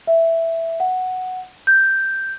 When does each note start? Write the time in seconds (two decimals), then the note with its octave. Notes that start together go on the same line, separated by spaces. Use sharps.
0.07 E5
0.80 F#5
1.67 G6